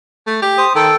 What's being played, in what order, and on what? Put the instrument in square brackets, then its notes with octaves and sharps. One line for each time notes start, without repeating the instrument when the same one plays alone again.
[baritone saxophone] A3
G4
[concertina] C5 D#6
[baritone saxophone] D#3 [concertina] A4 G5